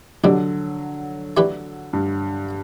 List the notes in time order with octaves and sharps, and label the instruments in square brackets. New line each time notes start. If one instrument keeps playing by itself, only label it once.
[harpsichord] B2 G3 D4 [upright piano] D3 F#3
[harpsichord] E3 A3 D4 G4 B4
[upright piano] G2